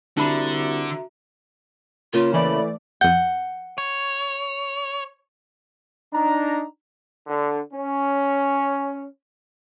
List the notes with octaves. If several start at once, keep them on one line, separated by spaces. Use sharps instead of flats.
C2 D3 D4 F#4 E5 A#5 B5
C#3 A#3 F4
E3 A3 D5 B5
F2 F#5 G6
C#5
D4 D#4 A#5
D3
C#4